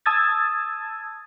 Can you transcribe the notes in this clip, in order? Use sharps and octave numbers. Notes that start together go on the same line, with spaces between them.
A5 D#6 E6 G#6 A6